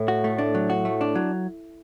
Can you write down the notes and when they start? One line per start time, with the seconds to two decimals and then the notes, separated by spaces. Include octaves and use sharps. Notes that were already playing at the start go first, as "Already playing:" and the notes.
Already playing: A2
0.08 F#4
0.24 A3
0.38 D4
0.55 F#3
0.70 F#4
0.85 A3
1.01 D4
1.15 F#3